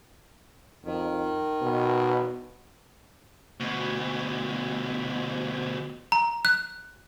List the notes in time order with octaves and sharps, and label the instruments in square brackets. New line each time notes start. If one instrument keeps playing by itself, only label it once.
[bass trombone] F2 [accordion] D#3
[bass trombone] B2
[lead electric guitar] D2 B2
[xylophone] A#5
F#6